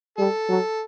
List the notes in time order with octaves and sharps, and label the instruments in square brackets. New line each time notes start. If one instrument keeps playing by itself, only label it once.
[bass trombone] G3 [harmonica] A4
[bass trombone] F#3